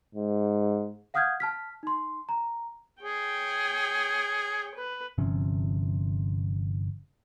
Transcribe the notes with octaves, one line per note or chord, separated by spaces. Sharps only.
G#2
F5 F#5 D#6 F6 G6 G#6
A5 F6 B6
D#4 C6
A#5
G#4 C#5 G5
B4
G1 C3 F3 C#4